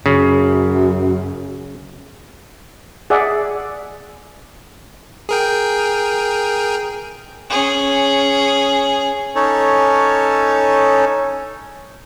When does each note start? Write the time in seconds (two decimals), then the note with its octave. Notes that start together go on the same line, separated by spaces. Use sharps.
0.06 F#2 C#3
3.10 G#4 D5 E5 F#5
5.29 G#4 A#4 G5
7.50 C#4 G#4
9.36 C#4 D#4 A4 C#5